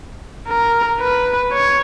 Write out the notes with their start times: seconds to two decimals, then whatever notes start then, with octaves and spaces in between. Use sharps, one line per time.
0.48 A#4
1.00 B4
1.53 C#5